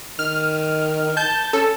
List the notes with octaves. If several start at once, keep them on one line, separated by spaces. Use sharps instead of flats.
D#3 F6
A5 G6
C#4 A4